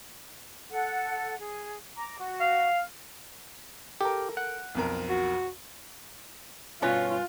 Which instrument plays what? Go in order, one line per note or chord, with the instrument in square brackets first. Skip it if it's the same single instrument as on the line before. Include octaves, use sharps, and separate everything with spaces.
[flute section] A4 F#5
G#4
A#5 D6
F#4
[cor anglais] F5
[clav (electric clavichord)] G4 [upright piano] A4 A#4
[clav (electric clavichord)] F#5
[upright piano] B1 F2 A#4
[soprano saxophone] F#4
[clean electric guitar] G2 B4 G#5 [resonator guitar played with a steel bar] B2 C#4 C#5 [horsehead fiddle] F4